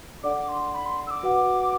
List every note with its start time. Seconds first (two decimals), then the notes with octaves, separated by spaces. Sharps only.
0.23 D4 A4 D5 F#5 D6
0.49 C6
0.73 B5
0.86 C6
1.07 E6
1.11 D6
1.23 F#4 B4 F#5